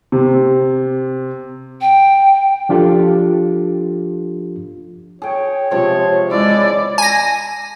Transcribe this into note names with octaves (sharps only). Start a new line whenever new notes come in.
C3
G5
F3 D4 F4 G4 A4
G#4 C#5 G5
C3 F3 G#3 C#5
G#3 E4 D5
G#5 A#6